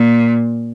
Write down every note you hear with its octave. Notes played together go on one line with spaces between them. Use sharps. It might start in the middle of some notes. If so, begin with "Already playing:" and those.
Already playing: A#2